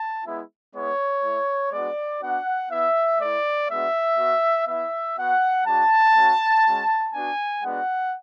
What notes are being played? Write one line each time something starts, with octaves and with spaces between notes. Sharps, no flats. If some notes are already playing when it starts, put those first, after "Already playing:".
Already playing: A5
G#3 B3 E4
G#3 B3 E4 C#5
A3 E4
G#3 B3 D4 F#4 D5
B3 D4 F#4 F#5
B3 E4 E5
A3 E4 D5
G#3 B3 D4 F#4 E5
B3 F#4
B3 E4 E5
B3 F#4 F#5
G#3 D4 F#4 A5
A3 C#4 F#4
G#3 C#4 F#4
B3 D4 F#4 G#5
G#3 B3 D4 F#4 F#5